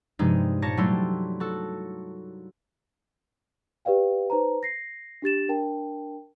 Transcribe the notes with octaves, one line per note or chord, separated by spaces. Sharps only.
G2 C3 F3 G#3 D#4
A#2 C#5 A5 A#6 C#7
F#3 G3 A3 E4 C6
F#4 A4
G4 B4 D5 F5 G5
D#4 B4 C5 A5 A#5
A#6 C7
D4 G4 A6 E7
D4 A#4 G5 A5